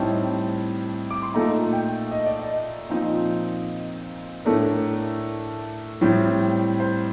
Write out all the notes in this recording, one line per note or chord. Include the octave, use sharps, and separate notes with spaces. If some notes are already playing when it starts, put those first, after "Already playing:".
Already playing: A2 G3 C4 D#4 A5
D6
C6
A#2 A3 D#4 A#5
G5
D#5
D5
D#5
A#2 F3 C4 D#4
A2 A3 D4 A#4
A2 G3 C4
C5